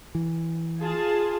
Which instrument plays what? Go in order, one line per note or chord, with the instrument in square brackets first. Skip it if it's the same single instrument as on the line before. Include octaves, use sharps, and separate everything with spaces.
[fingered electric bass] E3
[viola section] F4 G#4 A5